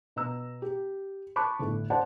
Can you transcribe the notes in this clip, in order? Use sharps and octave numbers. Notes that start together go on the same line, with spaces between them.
B2 A#5 E6
G4
A5 B5 C#6 D6 F#6
G1 A2
C5 D5 F#5 A5